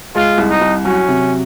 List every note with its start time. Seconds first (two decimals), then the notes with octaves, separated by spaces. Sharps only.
0.15 G#3 F4
0.38 C2
0.50 D#4
0.61 C2
0.85 F#3 C#4
1.08 C3